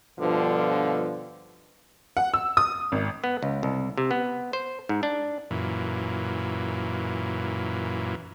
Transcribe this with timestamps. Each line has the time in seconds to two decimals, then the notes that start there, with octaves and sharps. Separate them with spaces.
0.20 G2 B2 D3 F3
2.17 F#5
2.34 E6
2.57 D#6
2.92 G#1
3.24 B3
3.43 C#2
3.63 C2
3.98 C3
4.11 B3
4.53 C5
4.89 G#2
5.03 D4
5.51 F#2 A#2 E3